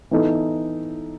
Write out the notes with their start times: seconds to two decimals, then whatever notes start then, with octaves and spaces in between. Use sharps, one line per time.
0.11 E3 B3 D#4 A4